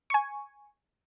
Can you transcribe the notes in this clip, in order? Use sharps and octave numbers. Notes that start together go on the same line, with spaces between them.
G#5 C#6